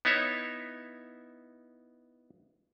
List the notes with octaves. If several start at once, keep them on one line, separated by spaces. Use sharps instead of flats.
B3 D#4 E4 C#5 E5